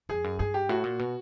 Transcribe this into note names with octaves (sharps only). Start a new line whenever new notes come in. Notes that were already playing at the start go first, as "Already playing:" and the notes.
F2 G#4
F#2
G2 G#4
G4
A2 F#4
A#2
B2